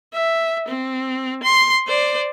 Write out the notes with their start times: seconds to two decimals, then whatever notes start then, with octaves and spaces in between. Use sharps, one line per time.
0.13 E5
0.68 C4
1.43 C6
1.87 C5 D5